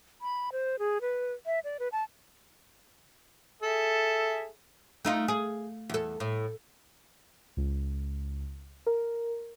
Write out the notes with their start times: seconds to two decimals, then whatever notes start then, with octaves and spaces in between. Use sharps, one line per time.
0.21 B5
0.52 C5
0.79 G#4
1.01 B4
1.46 E5
1.64 D5
1.79 B4
1.92 A5
3.62 G#4 A4 E5
5.05 A3 D#4 F4
5.28 G#4
5.90 E2 A4
6.20 A2
7.57 C#2
8.87 A#4